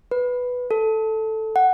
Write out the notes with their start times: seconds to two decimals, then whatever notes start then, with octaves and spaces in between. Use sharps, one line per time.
0.11 B4
0.71 A4
1.56 F#5